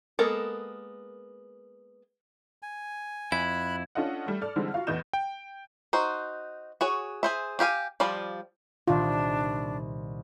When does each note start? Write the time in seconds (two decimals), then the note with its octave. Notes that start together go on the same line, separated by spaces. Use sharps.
0.19 G#3 A#3 B3 A4 A#4
2.63 G#5
3.32 F2 E4 B5 F#6 G#6
3.95 C#4 D4 F4 A4 D#5 F#5
4.26 G3 A3
4.41 A4 D5 F6
4.56 D3 E3 G3 G#3 C4
4.74 F4 F#4 F5
4.87 A1 E2 B3 D#5 G6 E7
5.13 G5
5.93 D#4 F#4 C5
6.81 F#4 G#4 C#5
7.23 G#4 C5 E5
7.59 D4 G4 F5 G#5
8.00 F3 G3 F4 D5
8.88 C2 A#2 D#3 D4 F4